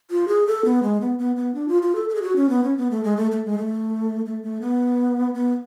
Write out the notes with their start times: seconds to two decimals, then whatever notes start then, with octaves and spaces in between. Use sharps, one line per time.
0.10 F4
0.28 G#4
0.47 A4
0.65 B3
0.83 G#3
1.01 B3
1.19 B3
1.36 B3
1.54 D4
1.68 F4
1.82 F4
1.95 A4
2.09 A4
2.15 G#4
2.22 F#4
2.36 C#4
2.49 B3
2.64 C#4
2.77 B3
2.91 A3
3.04 G#3
3.17 A3
3.31 A3
3.45 G#3
3.58 A3
4.26 A3
4.43 A3
4.61 B3
5.34 B3